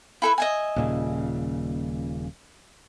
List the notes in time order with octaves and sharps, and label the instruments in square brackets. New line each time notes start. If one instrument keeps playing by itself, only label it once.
[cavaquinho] E4 A4 B4
D#5 E5 G#5
[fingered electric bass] D#1 A#2 C#3